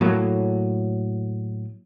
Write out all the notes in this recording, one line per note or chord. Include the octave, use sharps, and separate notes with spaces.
A2 F#3 A#3